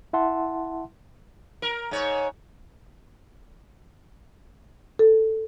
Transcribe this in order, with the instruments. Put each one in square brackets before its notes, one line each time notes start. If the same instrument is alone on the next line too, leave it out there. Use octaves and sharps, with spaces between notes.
[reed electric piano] E4 E5 F#5 A5 C6
[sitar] A#4
G#2 C#5
[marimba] A4